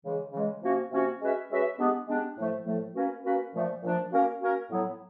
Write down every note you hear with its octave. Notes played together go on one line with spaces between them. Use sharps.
C#3 E3 G#3
C#3 E3 G#3
C3 F3 A#3 C#4 F#4
C3 F3 A#3 C#4 F#4
G#3 C#4 F#4 B4 E5
G#3 C#4 F#4 B4 E5
G#3 B3 D4 G4
G#3 B3 D4 G4
A2 F3 A3
A2 F3 A3
A#3 C#4 F#4 B4
A#3 C#4 F#4 B4
A#2 F3 A3 D4
A#2 F3 A3 D4
A#3 C#4 F#4 A#4
A#3 C#4 F#4 A#4
A2 F#3 B3 E4